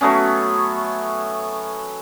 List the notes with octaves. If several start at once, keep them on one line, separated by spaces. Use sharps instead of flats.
F#3 A3 B3 C#4